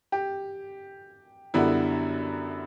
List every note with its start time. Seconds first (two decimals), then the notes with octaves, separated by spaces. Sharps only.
0.12 G4
1.54 F#2 D3 G3 B3 E4